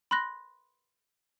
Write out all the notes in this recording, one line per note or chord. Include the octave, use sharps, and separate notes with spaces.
B5 C6 F#6 A#6